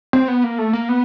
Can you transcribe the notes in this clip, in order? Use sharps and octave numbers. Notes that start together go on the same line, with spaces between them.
C4
B3
A#3
A3
A#3
B3